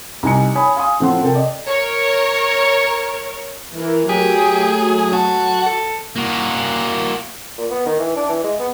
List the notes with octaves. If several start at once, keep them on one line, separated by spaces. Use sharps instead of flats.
C2 D#4 G#5 C#7
C#5 G#5 B5 D#6
F5 G#5 C6 D#6
A2 F3 C4 A4 F#5 C6
C3 A4 A#4 G5
D5 D#5
A#4 C#5
E3 E4 A#4
F#3 A3 G4 G#4
F#4 A5
A4
A#3 F#4
A#2
B3
D#3
E3
D4
E3
G#3
B3